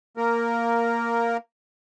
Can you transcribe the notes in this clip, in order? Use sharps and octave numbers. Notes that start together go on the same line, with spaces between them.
A#3 A#4